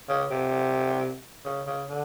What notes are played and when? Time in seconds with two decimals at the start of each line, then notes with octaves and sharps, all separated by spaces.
0.09 C#3
0.31 C3
1.45 C#3
1.67 C#3
1.90 D3